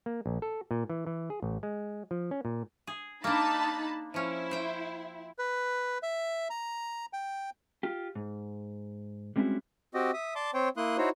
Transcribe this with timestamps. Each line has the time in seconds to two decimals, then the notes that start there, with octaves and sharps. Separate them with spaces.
0.06 A#3
0.26 A#1
0.42 A4
0.71 A#2
0.90 E3
1.07 E3
1.30 G#4
1.42 A1
1.63 G#3
2.11 F3
2.31 C#4
2.45 A#2
2.87 G#4
3.24 A#3 D4 D#4 A5 B5
4.14 F3 C#4 E4
4.51 C5 G5
5.39 B4
6.03 E5
6.50 A#5
7.13 G5
7.83 F4 G4
8.15 G#2
9.36 G3 G#3 C4 C#4 E4 F#4
9.94 C4 F#4 G4 D#5
10.13 E5 D#6
10.36 D5 A5 C6 D6
10.54 C4 C5 C#5 G5
10.77 A#3 E4 C6 D#6 F#6
10.97 D#4 E4 F#4 C5 C#5